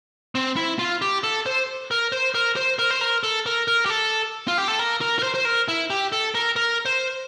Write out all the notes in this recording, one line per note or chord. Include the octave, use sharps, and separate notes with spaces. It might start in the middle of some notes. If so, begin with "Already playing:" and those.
C4
E4
F4
G4
A4
C5
A#4
C5
A#4
C5
A#4
C5
A#4
A4
A#4
A#4
G4
A4
F4
G4
A4
A#4
A#4
A#4
C5
C5
A#4
E4
G4
A4
A#4
A#4
C5